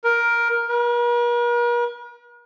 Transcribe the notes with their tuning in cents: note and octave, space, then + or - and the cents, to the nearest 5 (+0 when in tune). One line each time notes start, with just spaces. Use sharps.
A#4 +10
A#4 +45